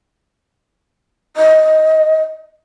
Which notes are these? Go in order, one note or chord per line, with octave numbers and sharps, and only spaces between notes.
D#5